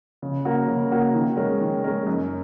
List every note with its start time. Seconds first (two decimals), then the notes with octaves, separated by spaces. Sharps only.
0.22 C#3
0.45 A#3 F#4 A#4
0.67 C#3
0.91 A#3 F#4 A#4
1.15 D#3
1.37 G#3 C#4 A#4
1.61 D#3
1.84 G#3 C#4 A#4
2.07 F#2